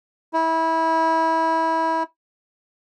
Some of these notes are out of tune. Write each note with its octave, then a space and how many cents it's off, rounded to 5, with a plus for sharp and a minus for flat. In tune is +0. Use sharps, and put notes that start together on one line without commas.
E4 -25